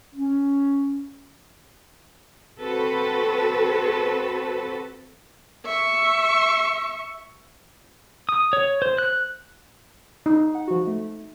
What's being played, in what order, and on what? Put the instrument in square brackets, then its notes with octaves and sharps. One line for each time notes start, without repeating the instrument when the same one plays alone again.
[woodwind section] C#4
[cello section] C4 F#4 A4 B4
[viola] E5 C#6
[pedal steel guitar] D#6
C#5
C5
F#6
[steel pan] D#4
[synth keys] F#5
F3 F#4
A3